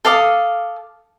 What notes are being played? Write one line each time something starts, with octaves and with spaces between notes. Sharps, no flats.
A4 F5 D6 D#6